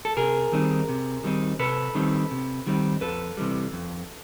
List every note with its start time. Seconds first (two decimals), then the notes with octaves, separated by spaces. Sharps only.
0.05 A4
0.17 C3 G#4 A#4
0.52 D#3 G3 C4 D#4
0.89 C3
1.24 D#3 G3 C4 D#4
1.59 C3 A4 B4
1.95 D#3 G3 C4 D#4
2.31 C3
2.67 D#3 G3 C4 D#4
3.01 F2 A4 B4
3.37 C3 E3 G3
3.73 F2